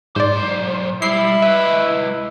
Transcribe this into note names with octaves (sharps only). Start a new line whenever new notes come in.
B1 G#2 C5 D5
G3 E4 C7
G#3 B4 E5